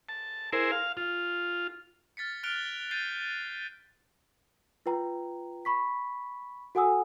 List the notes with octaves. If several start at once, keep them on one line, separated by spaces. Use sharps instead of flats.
A5
E4 G#4 A#4 C5
F5
F4
F6 A6 B6 C#7
F6 F#6 C#7 D7 F7 G7
G6 A6 C7 D#7
F4 B4 G5 A#5
B5 C#6 B6
F#4 A4 F#5 G#5 D#6 E6